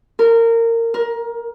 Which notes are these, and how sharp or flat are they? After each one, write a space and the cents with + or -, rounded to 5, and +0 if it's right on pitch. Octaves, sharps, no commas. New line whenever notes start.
A#4 -20
A#4 +20